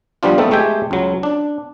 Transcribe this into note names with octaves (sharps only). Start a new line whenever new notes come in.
F3 G3 B3 D4 F4
A3 B3 C4 D#4 A4
G#3 A3 G4 E5 G5 G#5
C#2 F#3
D4